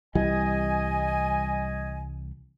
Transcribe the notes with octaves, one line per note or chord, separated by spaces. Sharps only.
C2 E3 G3 D#5 G#5